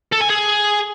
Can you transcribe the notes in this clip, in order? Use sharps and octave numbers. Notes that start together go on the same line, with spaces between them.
A4
G#5
G#4